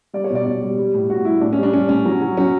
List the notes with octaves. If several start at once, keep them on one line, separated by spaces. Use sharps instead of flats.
G3 D5
C#5
B2
D5
B2 D5
G3
G3
A2
A2 F#4
G3 E4
A2 D4
C#4
G3 D4
G3 C#4
A2 C#4
F#3
F#3
F#3 C#4